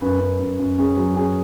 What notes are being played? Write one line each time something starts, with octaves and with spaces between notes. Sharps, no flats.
F#2 B4
F#2
F#2
F#2
C#4 G#4
F#3
C#4 G#4